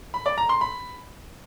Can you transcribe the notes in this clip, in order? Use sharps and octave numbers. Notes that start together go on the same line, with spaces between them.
B5
D5
A#5
C6
B5